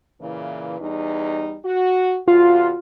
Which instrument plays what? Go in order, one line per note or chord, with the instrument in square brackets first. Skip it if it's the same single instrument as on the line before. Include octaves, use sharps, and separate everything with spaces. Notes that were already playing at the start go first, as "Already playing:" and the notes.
[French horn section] A#2 C#3 E3
E2 G3 D#4
F#4
[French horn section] E2 C3 F#4 [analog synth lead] F4